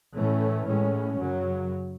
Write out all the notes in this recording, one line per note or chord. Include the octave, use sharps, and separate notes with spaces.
A2 E3 A3 C#4
A2 G#3 C#4
F#2 C#3 F#3